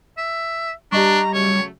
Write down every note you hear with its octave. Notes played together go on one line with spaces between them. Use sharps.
E5
G3 D4 G4 D#5 A#5 C#6
C#3 F#3 A3 C#5